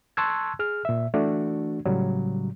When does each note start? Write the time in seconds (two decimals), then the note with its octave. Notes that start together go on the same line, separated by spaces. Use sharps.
0.17 A5 C6 C#6 E6 F#6 G#6
0.59 G#4 F6
0.85 A#2 E5
1.14 E3 A3 D4 F#4
1.85 A2 C#3 F#3 G3